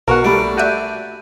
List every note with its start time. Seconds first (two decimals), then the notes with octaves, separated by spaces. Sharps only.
0.08 B1 B2 A#4 B4 F#5 C#6
0.24 G3 A3 D4 G4 B5 D7
0.57 F#4 D5 E5 F#6 G6 D#7